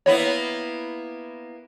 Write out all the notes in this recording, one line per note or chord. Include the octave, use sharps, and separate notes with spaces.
A#3 B3 E4 C#5